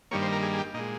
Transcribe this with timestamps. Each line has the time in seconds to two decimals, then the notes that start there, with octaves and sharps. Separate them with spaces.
0.11 G2 D#3 G3 A#3 C#5
0.22 C5
0.33 A#4
0.42 G#4
0.53 G#4
0.59 G4
0.74 A#2 D#4
0.79 G#3